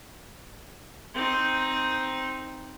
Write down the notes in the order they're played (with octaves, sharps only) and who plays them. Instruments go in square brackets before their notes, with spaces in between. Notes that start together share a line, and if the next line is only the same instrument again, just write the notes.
[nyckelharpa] C4 D#4